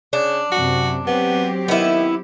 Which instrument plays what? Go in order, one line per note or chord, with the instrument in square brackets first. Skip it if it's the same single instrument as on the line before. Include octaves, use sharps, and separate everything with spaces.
[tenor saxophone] C#3 [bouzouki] D4
[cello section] F#2 C3 [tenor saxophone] F#4
[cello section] F#3 C4 G4 [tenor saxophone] B3
[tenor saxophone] D#3 [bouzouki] B3 E4